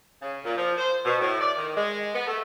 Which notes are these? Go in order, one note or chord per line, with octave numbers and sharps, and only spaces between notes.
C#3
A#2
F3
C5
B2
A2
D5
D#3
G#3
B3
A3